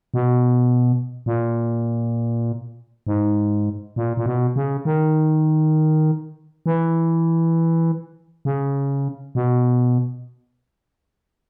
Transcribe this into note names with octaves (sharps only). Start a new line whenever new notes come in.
B2
A#2
G#2
A#2
A#2
B2
C#3
D#3
E3
C#3
B2